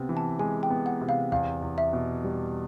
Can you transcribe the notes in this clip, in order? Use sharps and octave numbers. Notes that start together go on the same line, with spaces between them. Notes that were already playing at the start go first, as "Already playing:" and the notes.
Already playing: C3 B3
E3
A5
G#3 G#5
G5
B3
F#5
C3
F5
E2 F5
E2
E5
B2
G3